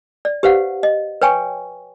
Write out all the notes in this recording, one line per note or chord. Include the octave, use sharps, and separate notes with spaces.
D5
G4 B4 C5 F5 F#5
D#5
B4 C#5 G5 G#5 C#6